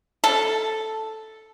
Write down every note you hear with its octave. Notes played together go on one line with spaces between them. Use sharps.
A4